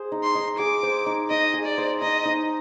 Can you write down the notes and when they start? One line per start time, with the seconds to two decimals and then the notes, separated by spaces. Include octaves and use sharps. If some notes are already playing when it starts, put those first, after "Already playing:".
Already playing: G#4 C5
0.12 D#4
0.24 C6
0.35 D#4
0.59 G#4 D6
0.83 C5
1.06 D#4
1.30 D#4 D#5
1.54 G#4
1.66 D5
1.78 C5
2.02 D#4 D#5
2.25 D#4